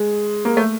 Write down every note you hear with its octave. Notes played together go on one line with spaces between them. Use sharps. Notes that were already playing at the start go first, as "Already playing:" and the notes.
Already playing: G#3
A#3
A3